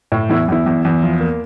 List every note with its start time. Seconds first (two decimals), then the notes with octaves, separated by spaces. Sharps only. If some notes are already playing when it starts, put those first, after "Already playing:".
0.12 A2
0.29 E2 E4
0.48 E2 E4
0.66 E2
0.85 E2
1.03 F3
1.21 A#3